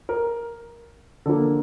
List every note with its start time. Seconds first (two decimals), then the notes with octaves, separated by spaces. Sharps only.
0.09 A#4
1.26 D3 F3 A#3 A4